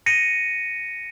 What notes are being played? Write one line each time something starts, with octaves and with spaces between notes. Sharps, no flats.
A#6 C#7 D#7